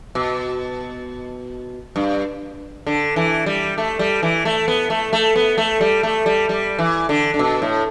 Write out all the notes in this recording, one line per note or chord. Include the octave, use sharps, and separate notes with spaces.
B2
G2
D3
E3
G3
A3
G3
E3
A3
B3
A3
A3
B3
A3
G3
A3
G3
G3
E3
D3
D3
B2
A2